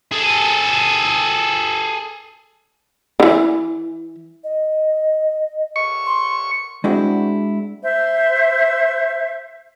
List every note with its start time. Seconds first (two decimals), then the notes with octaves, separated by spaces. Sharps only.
0.12 G#4 A4
3.20 D3 E3
4.44 D#5
5.76 C#6
6.06 C6
6.84 G#3 C4 D4 E4 F#4
7.83 C5 E5